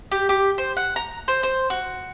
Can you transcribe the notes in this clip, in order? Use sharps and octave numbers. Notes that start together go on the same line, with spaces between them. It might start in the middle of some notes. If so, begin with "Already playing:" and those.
G4
G4
C5
F#5
A#5
C5
C5
F#4